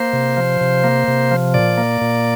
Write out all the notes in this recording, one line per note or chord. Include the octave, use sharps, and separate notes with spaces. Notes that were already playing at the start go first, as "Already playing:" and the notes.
Already playing: A#3 C5
C3
F3
C3
A#3
C3
F3
A#2 D5
A#3
A#2